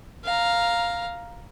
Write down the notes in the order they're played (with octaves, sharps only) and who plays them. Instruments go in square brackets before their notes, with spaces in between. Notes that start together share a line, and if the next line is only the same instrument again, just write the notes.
[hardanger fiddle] F5 A#5